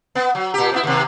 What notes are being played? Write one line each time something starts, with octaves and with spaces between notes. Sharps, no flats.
B3
F#3
A#2 G4
C3 B3 E4
D#2 C3